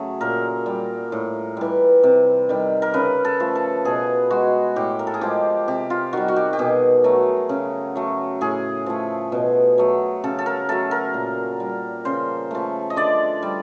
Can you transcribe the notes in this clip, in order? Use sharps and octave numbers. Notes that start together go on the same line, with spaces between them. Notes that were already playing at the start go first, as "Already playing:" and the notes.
Already playing: C#3 F#3 A3 G#4
A#2 A#4
G3
A2
E3 G3
C3
D#3 G3
A#4
C#3 B4
A4
F3 A3
A4
B2 G#4
G#3 F#4
A2 G4
A#4
A4
G#4
F3 G#3 G4
C3 G4
F4
D#3 G3 F#4
F#4
G4
G4
B2 G#4
F#3 A3
C#3
F#3 A3
A2 G#4
F3 A3
B2
F#3 A3
C#3 A4
A4
A#4
F#3 A3 A4
A#4
A#2
G3
C#3 C5
F3 A3
D#5
D3 D5
G3